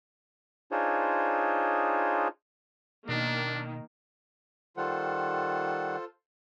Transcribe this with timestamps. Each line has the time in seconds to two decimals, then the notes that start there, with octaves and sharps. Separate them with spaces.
0.71 D4 D#4 F4 G#4 C5 C#5
3.09 B2 D#3 A#3 D4
4.77 D#3 G3 F4 A4 C5 F#5